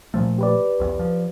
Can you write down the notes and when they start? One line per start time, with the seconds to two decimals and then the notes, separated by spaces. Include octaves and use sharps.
0.14 A#2 F3 A3
0.38 G4 B4 D5
0.80 B1 E2
0.99 F3